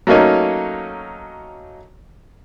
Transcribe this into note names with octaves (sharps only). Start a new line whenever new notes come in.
F#3 A3 A#3 C#4 D#4